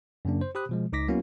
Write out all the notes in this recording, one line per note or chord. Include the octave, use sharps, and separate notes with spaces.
F#2 C#3 A#3 D4
C5
G4 C5 B5 D#6 F#6
B2 F3 G#3
C#2 D#4 D6 A#6 B6
F#3 A#3 B3 C#4 E4 F#4